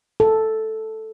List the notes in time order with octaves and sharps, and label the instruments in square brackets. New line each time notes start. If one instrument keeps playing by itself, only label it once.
[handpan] A4